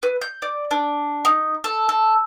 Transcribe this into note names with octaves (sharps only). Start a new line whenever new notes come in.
B4
G6
D5
D4
D#4
A4
A4